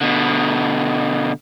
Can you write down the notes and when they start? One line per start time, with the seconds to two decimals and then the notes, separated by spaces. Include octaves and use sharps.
0.01 B2 D3